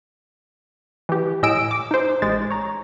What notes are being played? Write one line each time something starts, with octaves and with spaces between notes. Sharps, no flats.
E3 G4
A2 D#5 G#5 E6 D7 E7
D6
D#4 C5
A1 G#3 A6
C#5 A#5